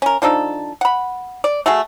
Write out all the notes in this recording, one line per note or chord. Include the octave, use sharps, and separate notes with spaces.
C#4 A#4
F3 D4 D#4 A4
F#5 B5
D5
A3 F#4 G#4